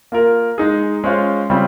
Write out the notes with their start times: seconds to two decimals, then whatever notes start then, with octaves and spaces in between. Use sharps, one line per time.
0.12 A#3 F4 A#4
0.58 G#3 D#4 G#4
1.04 G#3 C#4 F4 C5
1.50 C#3 G3 C4 F4